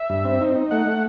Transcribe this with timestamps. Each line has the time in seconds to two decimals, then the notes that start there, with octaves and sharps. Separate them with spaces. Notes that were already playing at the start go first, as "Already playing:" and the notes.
Already playing: E5
0.10 G2
0.25 C4
0.40 D#4
0.55 D#4
0.71 A3 F#5
0.86 A3